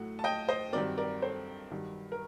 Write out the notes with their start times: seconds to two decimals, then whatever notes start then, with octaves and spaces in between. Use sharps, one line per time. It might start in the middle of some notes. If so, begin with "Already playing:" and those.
Already playing: A2 F#3 A3 F#5
0.19 A5
0.24 D#5 G5
0.48 C5 D#5
0.73 G2 D#3 F#3 C4 A#4 D5
0.98 A#4 D5
1.22 A4 C5
1.71 G2 D#3 F#3
2.12 A#4